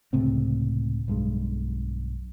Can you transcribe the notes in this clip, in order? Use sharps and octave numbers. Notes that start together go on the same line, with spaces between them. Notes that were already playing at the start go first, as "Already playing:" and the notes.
C#2 A2 C3 C4
B1 G2 G#3